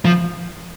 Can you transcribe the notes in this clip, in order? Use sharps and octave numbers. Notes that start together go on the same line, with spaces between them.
F3